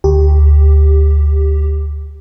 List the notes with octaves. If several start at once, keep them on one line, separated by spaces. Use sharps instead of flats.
D2 G4